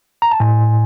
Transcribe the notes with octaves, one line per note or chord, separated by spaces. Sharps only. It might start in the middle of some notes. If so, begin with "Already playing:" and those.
A#5
A5
A2 G#5